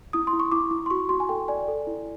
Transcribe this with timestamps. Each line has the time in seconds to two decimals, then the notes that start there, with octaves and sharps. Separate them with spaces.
0.13 E4 D#6
0.27 C6
0.33 E4
0.40 C#6
0.52 E4 D6
0.71 E4
0.86 C6
0.90 F#4 C#6
1.09 F#4 C6
1.20 G#5
1.29 A4 G5
1.48 D5 G#5
1.68 A4
1.87 E4